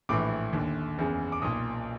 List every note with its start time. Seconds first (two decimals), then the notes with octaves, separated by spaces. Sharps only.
0.09 A#1 A2 E3 D6
0.53 D#2 D3
0.98 F#1 E2 C#3
1.32 D6
1.42 B1 A#2 D#6